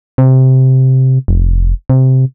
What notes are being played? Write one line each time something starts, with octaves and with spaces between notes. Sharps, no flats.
C3
F1
C3